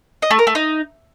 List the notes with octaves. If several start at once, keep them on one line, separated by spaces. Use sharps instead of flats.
D#5
A3
A#4
A3
D#4